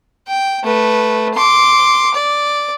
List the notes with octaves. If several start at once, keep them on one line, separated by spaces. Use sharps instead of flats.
G5
A3 B4
C6 D6
D5